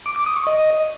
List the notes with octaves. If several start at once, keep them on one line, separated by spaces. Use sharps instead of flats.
D6
D6
D#6
C#6
D#5